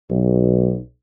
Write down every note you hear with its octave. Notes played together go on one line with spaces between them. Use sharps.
B1